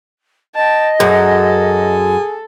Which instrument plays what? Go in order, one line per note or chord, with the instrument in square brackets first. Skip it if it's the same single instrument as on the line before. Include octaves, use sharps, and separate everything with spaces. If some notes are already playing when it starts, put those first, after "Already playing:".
[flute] D#5 [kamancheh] G5 A5
[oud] F#2 [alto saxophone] G#4 [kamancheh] A4